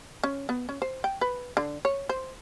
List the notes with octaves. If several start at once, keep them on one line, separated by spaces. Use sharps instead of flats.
C#4
B3
C#4
C5
G5
B4
D3
C#5
C5